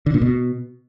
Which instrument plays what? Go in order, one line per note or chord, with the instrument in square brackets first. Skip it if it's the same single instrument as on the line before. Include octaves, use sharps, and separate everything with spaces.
[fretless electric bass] D3
A#2
B2